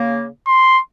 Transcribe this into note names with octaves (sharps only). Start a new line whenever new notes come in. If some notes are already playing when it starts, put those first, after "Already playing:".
Already playing: C#3 A#3
C6